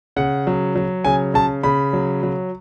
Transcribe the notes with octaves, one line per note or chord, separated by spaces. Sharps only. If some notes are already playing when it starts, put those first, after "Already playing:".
C#3 F#5
F#3
F#3
C#3 G#5
C#3 A5
C#3 B5
F#3
F#3